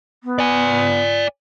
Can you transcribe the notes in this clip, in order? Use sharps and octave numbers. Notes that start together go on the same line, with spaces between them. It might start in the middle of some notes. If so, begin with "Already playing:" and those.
B3
D5 G#5